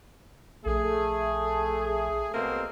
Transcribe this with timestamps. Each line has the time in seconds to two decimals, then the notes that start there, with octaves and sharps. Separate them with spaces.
0.66 A#1 A3 G#4
2.32 B2 A#3 C4